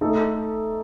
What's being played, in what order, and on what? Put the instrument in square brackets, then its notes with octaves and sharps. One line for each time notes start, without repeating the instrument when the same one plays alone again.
[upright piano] A3 D#4 A4